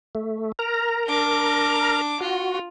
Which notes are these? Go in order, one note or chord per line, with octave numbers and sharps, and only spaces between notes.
A3
A#4 A#5
D4 D6
F4 F#4